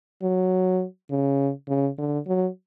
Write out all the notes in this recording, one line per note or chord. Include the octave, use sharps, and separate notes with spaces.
F#3
C#3
C#3
D3
F#3